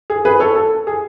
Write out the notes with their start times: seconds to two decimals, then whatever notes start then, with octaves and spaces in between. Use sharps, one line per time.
0.10 G#4
0.25 G#4 B4
0.40 A4 C#5
0.55 A4
0.87 G#4